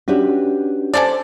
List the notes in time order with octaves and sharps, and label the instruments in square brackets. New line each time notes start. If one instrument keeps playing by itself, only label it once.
[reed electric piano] C#4 D4 F#4 [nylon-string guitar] G4 B4 E5
[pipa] C#4 A4 D5 [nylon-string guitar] C5